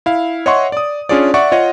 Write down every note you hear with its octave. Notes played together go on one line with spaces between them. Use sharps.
E4 F5
C#5 D#5 E5 F#5 C6 C#6
D5 D#6
C#4 D4 F4 G#4 C#5 D5
D5 E5 F#5 C#6
F4 C#5 D#5 F#5